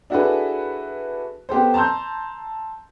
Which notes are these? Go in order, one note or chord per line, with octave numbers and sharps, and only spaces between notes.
D4 E4 F#4 G#4 A4 B4
B3 G4 A4 C5
A5 A#5 C6 E6 G6